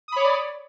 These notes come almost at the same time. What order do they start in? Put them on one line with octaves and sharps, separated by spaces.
D#6 B5 C#5 D6 D5